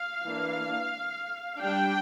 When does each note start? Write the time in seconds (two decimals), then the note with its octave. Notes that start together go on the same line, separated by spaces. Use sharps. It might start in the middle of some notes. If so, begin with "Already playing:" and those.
Already playing: F5
0.25 E3 A#3 D4
1.59 G3 D4 G5